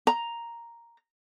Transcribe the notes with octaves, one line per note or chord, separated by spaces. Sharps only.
A#5